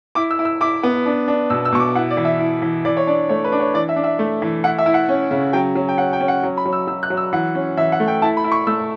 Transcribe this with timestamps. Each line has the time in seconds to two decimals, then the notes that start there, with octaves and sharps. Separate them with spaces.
0.15 E4 D6
0.31 E6
0.39 E4
0.45 E6
0.61 E4 D6
0.83 B3
1.06 D4
1.28 D4
1.50 B2 E6
1.65 E6
1.72 B2 C#6
1.80 D6
1.95 E4 F#5
2.10 D5
2.17 E3
2.25 E5
2.40 E4
2.62 E3
2.85 E3 D5
2.97 C#5
3.07 D4 D5
3.29 A3 C#5
3.44 B4
3.52 D4
3.60 C#5
3.74 E3 D5
3.89 E5
3.96 D4
4.04 E5
4.19 A3
4.42 E3
4.64 E4 F#5
4.78 E5
4.86 E4
4.94 F#5
5.09 C#4
5.31 C#3
5.53 F#3 G5
5.75 F#3
5.89 G5
5.98 C#4 F#5
6.13 G5
6.21 C#4
6.28 F#5
6.43 F#3
6.57 B5
6.65 F#3
6.73 E6
6.87 F#3 E6
7.03 F#6
7.10 F#3
7.17 E6
7.33 E3 F#5
7.55 C#4
7.77 E3 E5
7.92 F#5
8.00 A3
8.08 G5
8.22 E4 A5
8.37 B5
8.44 E4
8.52 C#6
8.67 A3 E6